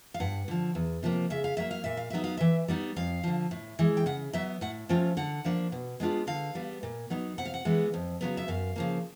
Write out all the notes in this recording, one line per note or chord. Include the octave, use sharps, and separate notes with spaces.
F5
G2 F#5
D3 F3
E2
C3 F3 A#3
C#3 E5
F5
F#3 A#3 E5
F5
A#2 E5
F5
F#3 B3 D#4 E5
F5
E3 E5
G3 B3 D#4
F2 F5
D3 F3
A2
E3 G#3
G5
C#3 F#5
F#3 B3 E5
A2 F#5
F3 A3 C#4 F4 G5
D3 F#5
F3 A#3 D4
B2
G#3 B3 D4 F4
D3 F5
G3 B3
A#2
F#3 B3 D#4
C3 F#5
F5
F#5
E3 G#3 B3
F2
C#3 F#3 B3
E5
F#2 F5
C#3 F3 A#3